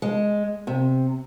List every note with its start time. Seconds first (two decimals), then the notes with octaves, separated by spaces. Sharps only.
0.02 G#3
0.67 C3